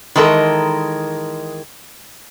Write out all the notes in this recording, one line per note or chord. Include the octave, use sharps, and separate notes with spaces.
D#3 E3 G#3 A4 A#4